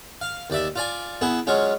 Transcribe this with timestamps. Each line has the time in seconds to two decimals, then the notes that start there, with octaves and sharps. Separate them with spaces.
0.21 F5
0.50 D#2 D5 E5
0.76 F4 D5 G#5
1.21 B3 E4 G#4
1.47 F#3 G#3 C#4 F4